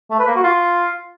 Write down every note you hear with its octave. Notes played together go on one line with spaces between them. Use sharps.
A3
B4
A#3
F#4
F4